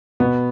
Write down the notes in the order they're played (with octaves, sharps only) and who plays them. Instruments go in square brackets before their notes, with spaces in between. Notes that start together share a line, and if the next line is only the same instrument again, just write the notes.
[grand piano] B2 B3